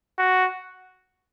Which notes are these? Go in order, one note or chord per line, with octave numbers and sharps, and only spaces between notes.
F#4